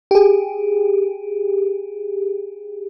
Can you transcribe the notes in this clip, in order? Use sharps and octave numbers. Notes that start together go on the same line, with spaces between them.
G4 G#4